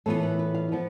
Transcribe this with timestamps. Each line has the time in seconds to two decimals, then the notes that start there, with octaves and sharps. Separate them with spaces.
0.06 A2 E3 B3 F4 A4
0.23 B4
0.39 B4
0.55 F5
0.72 F3 B3